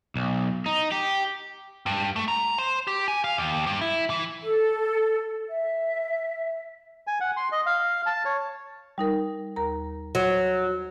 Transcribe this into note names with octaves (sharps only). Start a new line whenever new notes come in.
B1
D#4
G4
G2
A3
A#5
C5
G4
G#5
F5
D#2
G2
E4
E3
A4
E5
G#5
F#5
C6
D#5
F5
A5
C#5
G3 D#4 A#4
D#2 A#4 A#5
F#3